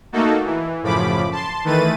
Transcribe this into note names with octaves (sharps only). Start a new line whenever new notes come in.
A3 A#3 D#4 F#4 A4
E3
F#2 A2 C#3 F3 B5 D6
A5 C6
D#3 E3 A3 B4 A6 D#7